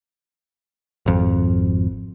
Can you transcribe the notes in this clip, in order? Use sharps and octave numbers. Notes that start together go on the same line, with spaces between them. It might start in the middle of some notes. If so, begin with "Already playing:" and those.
G#1 F2